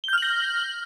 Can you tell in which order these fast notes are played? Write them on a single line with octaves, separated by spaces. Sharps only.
G7 G6 F6 F#7 A#6